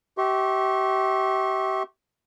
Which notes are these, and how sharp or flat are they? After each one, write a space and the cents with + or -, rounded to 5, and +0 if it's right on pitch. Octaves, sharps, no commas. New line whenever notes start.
G4 -35 E5 -30 C#6 -40